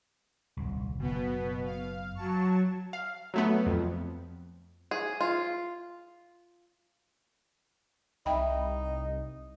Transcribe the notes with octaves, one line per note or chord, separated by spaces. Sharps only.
D#1 C2
F#1 B2 B3
F5
F#3 A5 C#6
F5
F#3 A3 B3
F2
G#4
F4
C2 D#4 E5 G5 B5